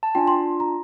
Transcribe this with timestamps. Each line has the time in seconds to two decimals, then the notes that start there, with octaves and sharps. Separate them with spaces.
0.03 A5
0.15 D4 F4 G5 G#5
0.27 C6
0.60 A#5